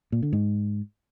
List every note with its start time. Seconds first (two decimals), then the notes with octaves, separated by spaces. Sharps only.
0.12 A#2
0.22 D3
0.33 G#2